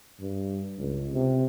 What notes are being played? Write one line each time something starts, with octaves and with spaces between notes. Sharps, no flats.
G2
C#2
C3